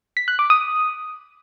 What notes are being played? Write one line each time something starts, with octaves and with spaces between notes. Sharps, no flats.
B6
F#6
D6
D#6